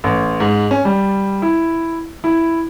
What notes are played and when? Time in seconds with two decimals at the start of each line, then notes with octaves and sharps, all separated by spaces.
0.04 A1
0.40 G#2
0.71 C#4
0.85 G3
1.42 E4
2.24 E4